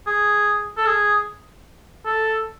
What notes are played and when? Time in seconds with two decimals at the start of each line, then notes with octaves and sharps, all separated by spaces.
0.07 G#4
0.77 A4
0.87 G#4
2.06 A4